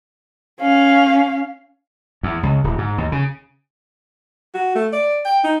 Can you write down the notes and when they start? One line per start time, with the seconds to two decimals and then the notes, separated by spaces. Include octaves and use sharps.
0.60 C#4 F5
2.23 E2
2.43 C#2
2.64 D1
2.78 G#2
2.98 D#2
3.12 C#3
4.54 F#4
4.75 A3
4.93 D5
5.25 G5
5.44 D#4